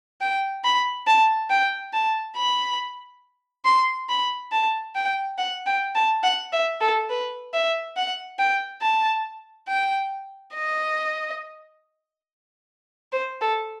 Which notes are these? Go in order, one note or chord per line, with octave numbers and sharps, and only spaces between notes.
G5
B5
A5
G5
A5
B5
C6
B5
A5
G5
F#5
G5
A5
F#5
E5
A4
B4
E5
F#5
G5
A5
G5
D#5
C5
A4